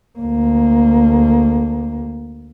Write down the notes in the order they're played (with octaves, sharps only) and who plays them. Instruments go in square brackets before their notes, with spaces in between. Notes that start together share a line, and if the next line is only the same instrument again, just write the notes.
[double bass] D2 A#3